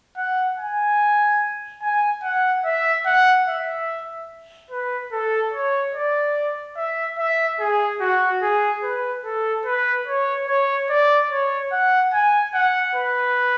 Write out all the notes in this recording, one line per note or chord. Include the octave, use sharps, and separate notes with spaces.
F#5
G#5
G#5
F#5
E5
F#5
E5
B4
A4
C#5
D5
E5
E5
G#4
F#4
G#4
B4
A4
B4
C#5
C#5
D5
C#5
F#5
G#5
F#5
B4